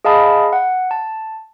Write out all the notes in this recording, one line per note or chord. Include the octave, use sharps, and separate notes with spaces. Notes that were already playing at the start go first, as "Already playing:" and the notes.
G#4 D#5 F5 A5 B5 D#6
F#5
A5